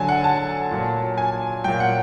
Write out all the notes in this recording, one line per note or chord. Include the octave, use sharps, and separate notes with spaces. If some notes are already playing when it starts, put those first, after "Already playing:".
Already playing: D3 F#3 G#5 A5
F#5
A5
A#2 F#3
G#5
A#2 F#3 G5
F#5